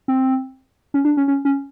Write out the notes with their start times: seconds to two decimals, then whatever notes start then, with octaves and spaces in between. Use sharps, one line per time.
0.08 C4
0.94 C#4
1.05 D4
1.17 C#4
1.28 C#4
1.45 C#4